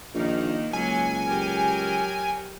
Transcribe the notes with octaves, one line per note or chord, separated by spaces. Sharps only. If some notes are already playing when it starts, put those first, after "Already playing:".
A#1 D#3 A#3 D#4
C#2 F#3 A#3 G#5
F#3 G4 A#4